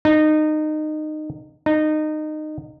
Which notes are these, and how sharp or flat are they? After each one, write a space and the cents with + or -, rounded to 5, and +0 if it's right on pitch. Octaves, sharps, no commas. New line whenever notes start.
D#4 -20
D#4 -20